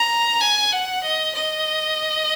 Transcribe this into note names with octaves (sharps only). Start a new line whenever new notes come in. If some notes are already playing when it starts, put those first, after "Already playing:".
Already playing: A#5
G#5
F#5
D#5
D#5